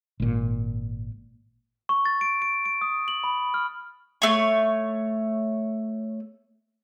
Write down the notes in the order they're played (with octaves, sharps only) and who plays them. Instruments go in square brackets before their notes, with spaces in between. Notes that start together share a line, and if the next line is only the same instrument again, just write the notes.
[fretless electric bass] G#1 A#2
[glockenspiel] C#6
A6
D7
D7
D7
D#6
F#7
B5
F6
[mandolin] A3 C#5